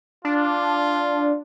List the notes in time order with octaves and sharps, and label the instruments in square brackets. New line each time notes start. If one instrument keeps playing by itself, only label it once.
[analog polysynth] D4 [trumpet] F4